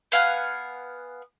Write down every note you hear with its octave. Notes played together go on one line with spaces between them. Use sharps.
B3 F5 F#5 G#5